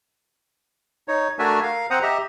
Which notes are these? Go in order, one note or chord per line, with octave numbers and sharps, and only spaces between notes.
D#4 C#5
A3 D4 F#4 A#4 E5 G#5
A#4 F5
C4 C5 F#5 A#5 D#6
G4 D#5 E5 A#5